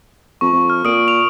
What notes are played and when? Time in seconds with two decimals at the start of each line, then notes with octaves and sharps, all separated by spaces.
0.41 F2 C#6
0.52 F2
0.70 F6
0.85 A#2 D#6 D7
1.08 F7